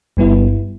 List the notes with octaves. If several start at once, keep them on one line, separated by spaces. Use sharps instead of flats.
G1 G2 G3 B3 E4